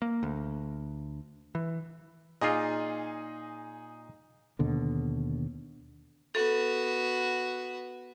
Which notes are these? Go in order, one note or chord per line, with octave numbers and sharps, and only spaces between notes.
A#3
D2
E3
A#2 D#4 F4 G#4 D#5
D#2 B2 D3
B3 F#4 A4